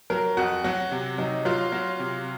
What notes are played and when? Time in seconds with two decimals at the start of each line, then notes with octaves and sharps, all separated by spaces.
0.10 F#3 A#4
0.37 F2 F#4
0.64 F#3 F#4
0.91 C3
1.18 F#3 D#4
1.45 F#3 F4
1.72 F#3
1.99 C3